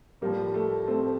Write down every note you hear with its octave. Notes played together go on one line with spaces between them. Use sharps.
A2 F3 G3 A#3
A3
A3 C4